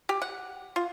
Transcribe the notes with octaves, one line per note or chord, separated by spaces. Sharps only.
G4
F#5
F4